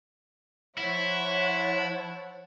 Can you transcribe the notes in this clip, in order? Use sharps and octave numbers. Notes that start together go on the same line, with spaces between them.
F3 E4 C#5 F#5